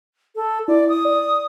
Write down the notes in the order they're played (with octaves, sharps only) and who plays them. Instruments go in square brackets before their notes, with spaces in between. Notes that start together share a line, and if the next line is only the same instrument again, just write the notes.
[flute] A4
[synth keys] E4 [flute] D5
[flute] D#6
[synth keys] D5